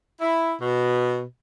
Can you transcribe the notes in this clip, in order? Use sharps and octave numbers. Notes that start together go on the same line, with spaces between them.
E4
B2